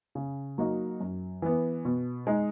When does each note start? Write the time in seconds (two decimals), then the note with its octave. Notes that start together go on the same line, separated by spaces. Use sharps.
0.15 C#3
0.58 F#3 A#3 D#4 F#4
1.01 F#2
1.42 E3 B3
1.85 B2
2.27 G#3 D#4